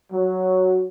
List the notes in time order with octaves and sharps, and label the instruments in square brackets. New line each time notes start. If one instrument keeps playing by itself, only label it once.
[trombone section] F#3